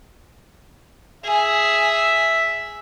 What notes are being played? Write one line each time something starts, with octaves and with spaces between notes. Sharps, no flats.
G#4 E5